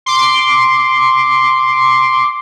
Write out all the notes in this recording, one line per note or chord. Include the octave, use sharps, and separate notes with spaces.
C6 D6